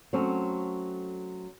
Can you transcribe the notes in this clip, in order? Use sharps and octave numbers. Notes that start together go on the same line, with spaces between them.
F#3 A3 C4 C#4